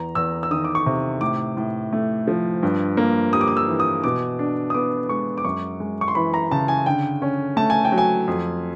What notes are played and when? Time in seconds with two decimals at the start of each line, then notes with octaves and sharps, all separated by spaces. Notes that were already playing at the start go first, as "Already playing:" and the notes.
Already playing: E2 A#5
0.15 E2 E6
0.43 E6
0.51 D#3 D#6
0.64 D6
0.75 C#6
0.86 C3
1.21 A2 D6
1.57 A2
1.93 A3
2.27 F3
2.63 G2
2.97 A#3
3.33 G3 D#6
3.41 D6
3.48 D#6
3.57 E6
3.68 E3
3.80 D#6
4.04 B2 D6
4.39 D4
4.70 D#6
4.74 B3 D6
5.09 G#3 C#6
5.38 D6
5.44 F#2 C#6
5.80 G#3
6.01 C#6
6.08 C6
6.15 E3 B5
6.34 A#5
6.51 C#3 A5
6.68 G#5
6.86 D3 G5
7.22 C#4
7.57 A3 A5
7.70 G#5
7.85 G5
7.92 F#3
7.98 G#5
8.27 F2